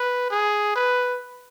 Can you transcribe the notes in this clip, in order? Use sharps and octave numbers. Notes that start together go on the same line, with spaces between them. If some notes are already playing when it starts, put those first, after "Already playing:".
Already playing: B4
G#4
B4